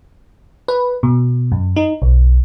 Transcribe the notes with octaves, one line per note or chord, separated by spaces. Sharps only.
B4
B2
F#2
D#4
B1